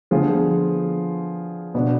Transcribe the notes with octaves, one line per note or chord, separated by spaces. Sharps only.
D3 F3 B3 F4 G#4
B2 B3 D4